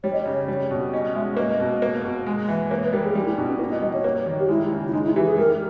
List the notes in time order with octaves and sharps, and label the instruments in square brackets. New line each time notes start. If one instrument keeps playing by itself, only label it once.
[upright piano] G3 [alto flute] C#5
[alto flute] D#5
[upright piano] C#3 [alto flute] C#5
[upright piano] G3
B2
[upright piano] C#4 [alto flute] D#5
[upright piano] G#3 [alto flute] E5
[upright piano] A#3 [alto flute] D#5
[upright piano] B2
A#3
B2
G#3
E3
[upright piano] A#3 [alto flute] C#5
[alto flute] B4
[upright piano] G3 [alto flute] A#4
[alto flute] G#4
[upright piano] G3 [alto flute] G4
[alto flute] D#4
E4
[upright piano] B2 [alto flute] D#4
[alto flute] C#4
[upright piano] A#3 [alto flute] E4
[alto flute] D#5
[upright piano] G3 [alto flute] D#5
[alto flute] C#5
[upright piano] A#3
D#3
[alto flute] G4
[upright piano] G#3 [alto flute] E4
[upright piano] C#3
[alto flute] E4
[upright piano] G#3 [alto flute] D#4
[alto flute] E4
[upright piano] E3 [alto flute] G4
[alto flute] G#4
[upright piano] G3 [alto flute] A#4